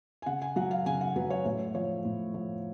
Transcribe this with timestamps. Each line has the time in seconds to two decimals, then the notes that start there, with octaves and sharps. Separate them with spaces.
0.22 G#5
0.26 C#3 F#5
0.42 G#5
0.56 F#3 F#5
0.71 F5
0.86 C#3 G#5
1.01 F#5
1.16 F#3 B4
1.30 C#5
1.45 A2 C#5
1.75 F3 C#5
2.05 A2
2.34 F3